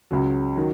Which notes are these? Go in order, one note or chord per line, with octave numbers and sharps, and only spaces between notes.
C#2 C#3 F#3
D#3 F#3